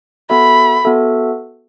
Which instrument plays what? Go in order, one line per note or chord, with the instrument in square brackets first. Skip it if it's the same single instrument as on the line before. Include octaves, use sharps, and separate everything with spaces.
[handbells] B3 F#4 A4 E5 [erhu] B5
[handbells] B3 F#4 A4 E5